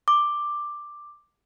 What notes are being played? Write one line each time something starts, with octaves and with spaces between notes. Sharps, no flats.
D6